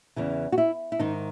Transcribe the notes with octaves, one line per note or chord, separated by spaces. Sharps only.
E2 C#3 E3
F#4
E4
E4
G#2 D#3 D#4